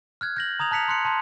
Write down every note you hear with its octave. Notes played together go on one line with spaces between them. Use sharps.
F6 F#6 G#6
G6 A#6 F#7
A#5 D#6 G#6 F7
A5 F#6 B6 C#7 F7
C6 F#6 C#7
A5 C6